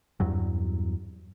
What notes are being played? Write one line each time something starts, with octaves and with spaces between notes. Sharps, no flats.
E2 G2 F#3